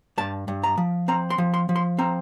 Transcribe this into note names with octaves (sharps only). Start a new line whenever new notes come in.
G2 A5
G2
A#5
F3
C4 A#5
C6
F3
C6
F3
C6
C4 A#5